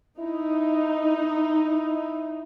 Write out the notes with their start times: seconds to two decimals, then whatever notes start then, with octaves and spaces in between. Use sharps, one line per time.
0.19 D#4 E4